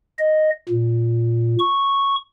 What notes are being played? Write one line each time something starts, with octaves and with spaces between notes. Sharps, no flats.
D#5
A#2
C#6